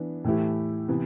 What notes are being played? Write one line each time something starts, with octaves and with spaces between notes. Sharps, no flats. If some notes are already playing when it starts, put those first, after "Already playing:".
Already playing: E3 B3 D4
A2 E3 A3 E4 G4
C3 E3 B3